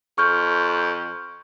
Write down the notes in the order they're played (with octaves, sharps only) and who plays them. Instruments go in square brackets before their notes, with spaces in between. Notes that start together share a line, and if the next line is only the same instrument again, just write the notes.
[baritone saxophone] F2 [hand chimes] C#6 F6 G6